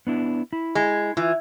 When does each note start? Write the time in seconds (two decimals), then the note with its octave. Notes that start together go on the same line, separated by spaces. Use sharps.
0.07 B3 D4 E4
0.53 E4
0.75 G#3
1.17 E3 F4